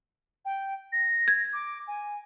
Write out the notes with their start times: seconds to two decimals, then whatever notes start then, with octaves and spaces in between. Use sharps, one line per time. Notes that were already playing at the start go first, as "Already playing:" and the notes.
0.45 G5
0.92 A#6
1.28 G#6
1.53 D6
1.87 G#5